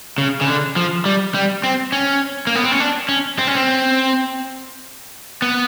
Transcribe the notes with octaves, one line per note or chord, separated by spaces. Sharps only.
C#3
C#3
D3
F3
G3
G3
C4
C#4
A#3
B3
C4
C#4
D4
C#4
C4
C#4
C4
B3